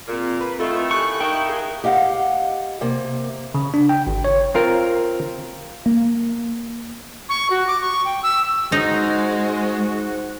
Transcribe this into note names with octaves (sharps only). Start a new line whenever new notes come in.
A#2 C4 G#4
C4 B4
A2 D#3 A3 F4 A4 D#5 E5
G4 G#5 C#6 F#6
D#4 E4 A#4 F5 G5
G#4
G4 D#5 F5 F#5
C3 A#3
C#3
D4
G5
G#1
C#5
C4 F4 A#4
A#3
C#6
F#4
D6
C#6
G5
E6
G#2 G#3 D#4 F#4